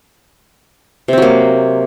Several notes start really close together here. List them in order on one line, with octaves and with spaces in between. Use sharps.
C3 C4 F#3 A#3